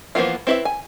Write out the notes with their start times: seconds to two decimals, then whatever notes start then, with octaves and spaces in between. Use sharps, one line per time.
0.15 E3 F3 A#3 B3 F4
0.47 C4 E4 B4 C#5 E5
0.65 G#5